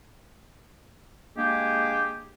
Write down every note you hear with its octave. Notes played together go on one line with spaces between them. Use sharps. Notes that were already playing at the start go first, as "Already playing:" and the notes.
G#3 A#3 D4 G4 G#4